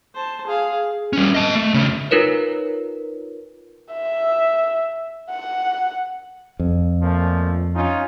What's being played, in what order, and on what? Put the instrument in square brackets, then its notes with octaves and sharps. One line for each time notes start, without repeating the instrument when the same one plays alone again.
[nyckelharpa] C5 A5
G#4 F5
[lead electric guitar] G3 C#4
D#5 A5
A3
C#3 A3
[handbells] D#4 F4 A#4 B4 C#5
[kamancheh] E5
F#5
[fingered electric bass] F2
[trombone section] A#2 F3 A3
C#4 D#4 F4